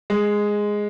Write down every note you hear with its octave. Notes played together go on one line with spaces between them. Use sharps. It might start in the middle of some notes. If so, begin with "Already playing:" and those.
G#3